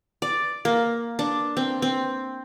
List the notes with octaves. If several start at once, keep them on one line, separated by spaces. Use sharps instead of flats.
D5
A#3
D4
C4
C4